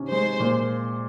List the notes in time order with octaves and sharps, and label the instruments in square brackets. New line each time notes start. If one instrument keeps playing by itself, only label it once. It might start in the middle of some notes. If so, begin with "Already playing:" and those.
Already playing: [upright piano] C3 D#3 C#4
[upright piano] G#3 [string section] C5
[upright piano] A#2